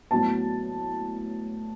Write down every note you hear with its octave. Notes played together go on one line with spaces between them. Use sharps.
A2 F#3 B3 A5